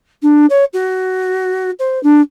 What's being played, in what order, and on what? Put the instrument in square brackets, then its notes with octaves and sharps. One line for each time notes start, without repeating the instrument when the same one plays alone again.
[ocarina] D4
C#5
F#4
C5
D4